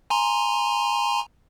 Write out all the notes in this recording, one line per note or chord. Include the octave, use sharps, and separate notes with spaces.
G#5 A#5 C6